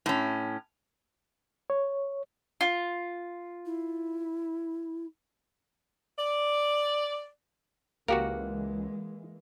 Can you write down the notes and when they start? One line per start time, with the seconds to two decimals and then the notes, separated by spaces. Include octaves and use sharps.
0.06 A2 C#4
1.70 C#5
2.61 F4
3.66 E4
6.17 D5
8.08 C#2 E3 G#3 A#3 F#4 G4 A#4 F#5